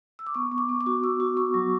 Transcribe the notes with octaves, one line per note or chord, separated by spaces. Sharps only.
E6
D6
B3 C#6
B3
D6
B3
D6
F#4
B3 E6
F#4
B3 C#6
F#3